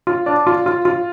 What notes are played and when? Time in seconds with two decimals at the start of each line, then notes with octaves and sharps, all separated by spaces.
0.07 F4
0.26 D4
0.47 F4
0.66 F4
0.85 F4